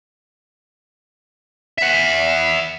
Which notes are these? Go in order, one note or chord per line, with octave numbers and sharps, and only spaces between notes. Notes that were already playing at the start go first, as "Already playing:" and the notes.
E5 F#5